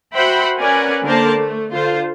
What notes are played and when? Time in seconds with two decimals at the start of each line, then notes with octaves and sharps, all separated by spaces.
0.14 F#4 C5 E5 F#5 G5 B5
0.61 C#4 A#4 B4 D5 F#5 G#5
1.05 D3 A#3 A#4 C5 D5 A5
1.37 A3
1.72 D3 F4 C5